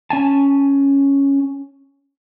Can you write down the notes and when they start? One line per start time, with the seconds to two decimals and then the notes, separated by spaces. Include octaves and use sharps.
0.10 C#4 G#5 A5